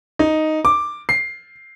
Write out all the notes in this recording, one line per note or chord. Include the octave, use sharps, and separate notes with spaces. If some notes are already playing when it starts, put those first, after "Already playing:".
D#4
D6
C7